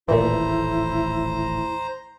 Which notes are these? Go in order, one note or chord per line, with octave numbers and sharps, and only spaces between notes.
D#1 A1 A#2 E3 A3 E4 C5 A#5